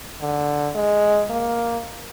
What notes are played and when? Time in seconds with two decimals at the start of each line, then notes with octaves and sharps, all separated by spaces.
0.21 D3
0.75 G#3
1.30 A#3